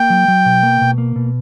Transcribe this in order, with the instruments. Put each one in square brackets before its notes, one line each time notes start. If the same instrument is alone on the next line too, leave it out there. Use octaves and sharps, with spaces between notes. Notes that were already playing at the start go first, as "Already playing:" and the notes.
Already playing: [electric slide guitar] A#3 [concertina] G5
[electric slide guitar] F#3
F#3
B2
A#3
B2
A#3
B2